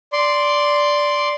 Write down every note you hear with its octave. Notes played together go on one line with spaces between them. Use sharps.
D5 C6